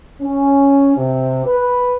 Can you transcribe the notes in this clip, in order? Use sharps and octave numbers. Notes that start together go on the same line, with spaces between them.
C#4
C3
B4